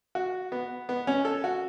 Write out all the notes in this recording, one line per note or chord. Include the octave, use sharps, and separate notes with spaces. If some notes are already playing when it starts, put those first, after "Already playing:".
F#4
B3
B3
C#4
A4
F#4